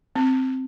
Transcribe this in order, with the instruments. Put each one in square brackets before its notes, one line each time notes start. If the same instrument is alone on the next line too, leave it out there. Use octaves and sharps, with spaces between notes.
[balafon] C4